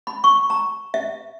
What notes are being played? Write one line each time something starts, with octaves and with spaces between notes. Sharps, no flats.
B5
C#6
A#5
E5